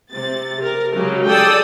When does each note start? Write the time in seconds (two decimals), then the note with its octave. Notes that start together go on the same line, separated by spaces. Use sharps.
0.11 C3 A6
0.62 A#4
0.93 C#3 F#3 G#3 G4
1.26 G#4 A4 D5 G5 D#6 E6